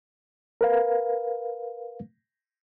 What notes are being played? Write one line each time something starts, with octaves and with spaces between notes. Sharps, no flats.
A#4 B4 F5